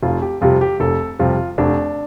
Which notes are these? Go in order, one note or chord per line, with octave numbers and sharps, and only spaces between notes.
F1 F4
G4
F2 C3 G3 F4
G4
F1 A4
F2 C3 G3 F4
F1 D4